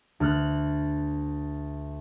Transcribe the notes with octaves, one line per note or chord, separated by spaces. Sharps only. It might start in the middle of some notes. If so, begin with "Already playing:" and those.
D2 F6 F#6